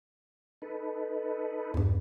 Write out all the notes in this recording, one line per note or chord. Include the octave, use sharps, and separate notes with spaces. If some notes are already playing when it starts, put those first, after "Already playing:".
D#4 A4 B4
E2 G2